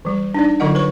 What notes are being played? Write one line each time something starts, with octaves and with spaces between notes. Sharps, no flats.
E3 G3
D4 D#4 D5
D3 F#3 F4 A#4 D#5 F#5
B4 C#5 C#6